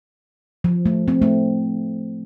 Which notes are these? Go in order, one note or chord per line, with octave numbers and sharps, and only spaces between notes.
F3
A3
C4
A3